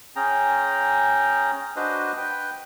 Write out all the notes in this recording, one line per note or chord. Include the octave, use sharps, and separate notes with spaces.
C#4 G#4 G5 A#5
D4 F#4 B4 C5 D#5
B4 G5